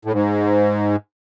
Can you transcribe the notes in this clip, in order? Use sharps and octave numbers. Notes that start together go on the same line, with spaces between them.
A2
G#2